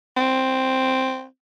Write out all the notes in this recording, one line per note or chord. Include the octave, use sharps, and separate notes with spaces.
C4